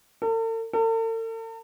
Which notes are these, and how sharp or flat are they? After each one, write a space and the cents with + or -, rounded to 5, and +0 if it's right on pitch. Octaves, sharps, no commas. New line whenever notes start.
A4 +45
A4 +45